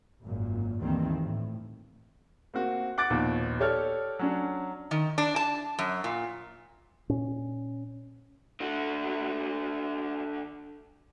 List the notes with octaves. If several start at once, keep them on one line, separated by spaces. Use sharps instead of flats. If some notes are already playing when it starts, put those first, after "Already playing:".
G#1 F#2 A#2
D2 G2 D#3 E3 A#3 C4
A2
A#3 C4 F#4
F#5 D6 F#6 A6 D7
A#1 D#2 B2
G4 A4 C#5 D5 F6
F#3 C#4 D4
D#3
D4
A5
F#2
A#2
A#2 C#4
D3 F#4